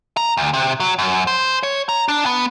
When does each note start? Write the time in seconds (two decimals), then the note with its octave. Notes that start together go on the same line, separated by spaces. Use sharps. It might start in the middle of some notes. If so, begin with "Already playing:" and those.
0.17 A#5
0.37 D2
0.54 C3
0.80 F#3
0.99 F#2
1.27 C5
1.63 C#5
1.89 A#5
2.08 D4
2.26 B3